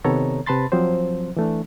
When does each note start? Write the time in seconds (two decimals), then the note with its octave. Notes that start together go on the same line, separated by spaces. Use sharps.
0.04 C3 D#3 B3 A4 C#5 A#5
0.46 C3 B4 A5 B5 C6 A6
0.72 F3 F#3 C4 C5
1.37 E3 A3 D4